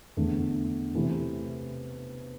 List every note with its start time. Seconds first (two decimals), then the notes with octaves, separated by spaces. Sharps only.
0.17 E2 D3 A3
0.94 C3 E3 A3